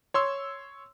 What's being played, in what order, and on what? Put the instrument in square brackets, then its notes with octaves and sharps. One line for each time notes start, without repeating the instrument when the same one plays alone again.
[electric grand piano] C#5 C6 E6